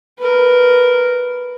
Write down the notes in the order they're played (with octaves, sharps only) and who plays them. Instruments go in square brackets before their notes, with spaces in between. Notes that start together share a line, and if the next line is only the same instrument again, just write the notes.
[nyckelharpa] A#4 B4